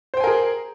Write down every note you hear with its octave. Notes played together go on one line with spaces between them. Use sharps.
G#4 A#4 C5 G5 G#5